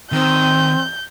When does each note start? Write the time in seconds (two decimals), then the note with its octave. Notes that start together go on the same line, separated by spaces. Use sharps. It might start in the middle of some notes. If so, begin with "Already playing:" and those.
0.12 D#3 C4 G6